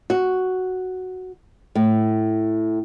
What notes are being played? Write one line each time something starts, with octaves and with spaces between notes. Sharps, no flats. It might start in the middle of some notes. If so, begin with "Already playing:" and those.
F#4
A2